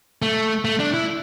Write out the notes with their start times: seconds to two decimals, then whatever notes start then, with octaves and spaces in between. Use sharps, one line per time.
0.22 A3
0.65 A3
0.80 D4
0.94 E4